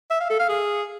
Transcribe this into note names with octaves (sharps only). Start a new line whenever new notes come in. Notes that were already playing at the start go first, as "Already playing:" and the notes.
E5
F5
A4
F5
G#4